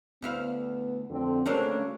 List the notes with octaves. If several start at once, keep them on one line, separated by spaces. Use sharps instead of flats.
D2 B3 E4 F5
F2 D3 C4
D2 C#3 A3 A#3 C#4 D4 C#5